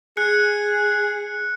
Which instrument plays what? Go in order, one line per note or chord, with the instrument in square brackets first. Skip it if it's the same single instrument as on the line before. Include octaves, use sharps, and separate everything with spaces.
[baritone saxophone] G#4 [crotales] F#6 C#7